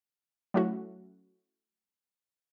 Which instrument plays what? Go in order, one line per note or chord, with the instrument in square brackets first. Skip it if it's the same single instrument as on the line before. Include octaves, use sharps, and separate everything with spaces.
[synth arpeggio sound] F#3 A3 C#4 E4 F#4